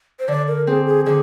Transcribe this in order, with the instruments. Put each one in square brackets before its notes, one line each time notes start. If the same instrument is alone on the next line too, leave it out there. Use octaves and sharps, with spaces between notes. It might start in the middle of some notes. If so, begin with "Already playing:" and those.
[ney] C5
[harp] D3 [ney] D5
[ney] A#4
[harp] C4 [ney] G#4
[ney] G#4
[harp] D3 [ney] G#4